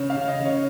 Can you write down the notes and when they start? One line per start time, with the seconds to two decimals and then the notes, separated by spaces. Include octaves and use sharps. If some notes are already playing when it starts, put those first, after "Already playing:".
Already playing: C#3 C#5
0.10 F5
0.16 C#3
0.28 D#5
0.40 C#3
0.45 C#5